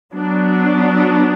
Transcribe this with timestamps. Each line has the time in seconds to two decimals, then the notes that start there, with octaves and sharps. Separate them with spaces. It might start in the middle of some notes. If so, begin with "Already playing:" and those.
0.14 F#3 B3 D4